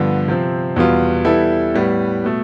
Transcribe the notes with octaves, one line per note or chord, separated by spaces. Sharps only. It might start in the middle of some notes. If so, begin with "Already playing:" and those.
Already playing: G2 D3 F3 B3
C3 F3 C4
E2 B2 G3 B3 F4
E3 G3 B3 E4 A4
A2 G3 B3
B2 A3